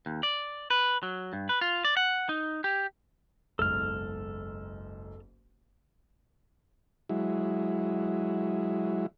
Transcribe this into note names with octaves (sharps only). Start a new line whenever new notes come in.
D#2
D5
B4
F#3
G2
B4
F4
D5
F#5
D#4
G4
F#1 B1 G#2 A4 F6
F#3 G#3 E4